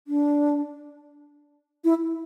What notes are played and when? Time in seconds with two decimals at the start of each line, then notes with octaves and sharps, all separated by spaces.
0.07 D4
1.84 E4